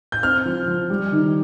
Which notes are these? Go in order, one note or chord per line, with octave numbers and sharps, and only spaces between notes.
G6
C4 F6
F3
F3
G3
D#3